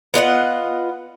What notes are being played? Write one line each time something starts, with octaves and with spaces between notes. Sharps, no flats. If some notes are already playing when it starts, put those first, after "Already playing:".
B3 F4 D#5 F#5